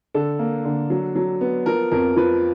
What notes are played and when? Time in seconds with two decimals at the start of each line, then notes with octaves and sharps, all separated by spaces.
0.14 D3 A4
0.39 A#3
0.65 D3
0.90 F#3
1.16 F#3
1.41 B3
1.66 F3 A#4
1.92 F2 A#4
2.16 F3 B4